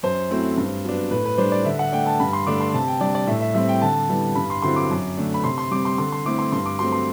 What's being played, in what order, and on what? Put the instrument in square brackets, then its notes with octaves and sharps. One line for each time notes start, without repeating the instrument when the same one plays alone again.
[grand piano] F#2 C5
F#3 A3 C4 E4
G2
F#3 B3 D4
A2 B4
B4
G3 D4 C5
D5
D3 E5
F#5
A3 D4 G5
A5
G2 B5
C6
D3 A3 D4 D6
C6
C3 A5
G5
G3 D4 D5
D5
A2 E5
E5
G3 C4 E5
G5
D3 A5
G3 B3 E4
G2 B5
C6
D3 F#3 C4 E4 C6
D6
F#2
D3 A3 D4
B5
C3 C6
C6
G3 C4 D6
C6
D3 C6
C6
A3 C4 E4 D6
C6
G2 C6
D6
F#3 A3 C4 C6
C6